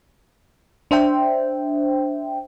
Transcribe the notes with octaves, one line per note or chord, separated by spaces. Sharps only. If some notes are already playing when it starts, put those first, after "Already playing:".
D4 C5 E5 G5